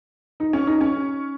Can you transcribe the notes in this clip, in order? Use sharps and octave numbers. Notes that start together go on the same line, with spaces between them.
D#4
C#4
D#4
C#4